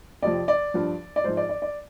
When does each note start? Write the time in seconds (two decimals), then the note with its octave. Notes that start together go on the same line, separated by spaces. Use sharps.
0.22 F2 C3 F3 D5
0.48 D5
0.74 G2 F3
1.16 D5
1.24 G#2 F3 C5
1.37 D5
1.49 D5
1.62 D5